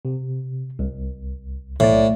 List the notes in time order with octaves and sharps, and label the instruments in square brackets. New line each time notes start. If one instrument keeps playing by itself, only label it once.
[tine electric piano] C3
C2
[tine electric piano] B1 D5 [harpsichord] A2